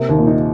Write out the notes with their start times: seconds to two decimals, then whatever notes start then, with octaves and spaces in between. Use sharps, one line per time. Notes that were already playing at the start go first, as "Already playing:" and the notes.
Already playing: C3 A#3
0.09 D#2
0.18 A#2
0.27 D#4